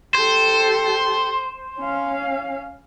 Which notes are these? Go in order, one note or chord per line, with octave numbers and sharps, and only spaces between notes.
G4 A4 C5
C#4 F5